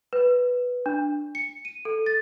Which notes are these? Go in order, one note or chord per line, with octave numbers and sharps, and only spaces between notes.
B4
D4
C#7
D#7
A4
A6